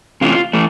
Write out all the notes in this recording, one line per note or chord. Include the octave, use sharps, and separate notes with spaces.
C3 E3 A3 C#4 F4
E3 A3 C#4